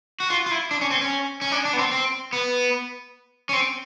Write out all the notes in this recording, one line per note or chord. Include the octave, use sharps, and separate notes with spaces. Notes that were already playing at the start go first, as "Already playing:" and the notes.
F#4
F4
F4
E4
D4
C#4
C4
C#4
C#4
D4
D4
B3
C4
C4
B3
C#4
C4